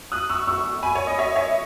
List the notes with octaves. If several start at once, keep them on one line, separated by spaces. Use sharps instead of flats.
D#6 F#6
C#6 E6
C#6 E6
G#5 B5
C#5
D#5
C#5 E5
C#5 E5